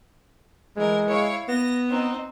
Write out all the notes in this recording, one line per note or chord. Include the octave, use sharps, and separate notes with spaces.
E3 G#3 A#4
E4 C#5 F5
B3 A#6
C4 D#4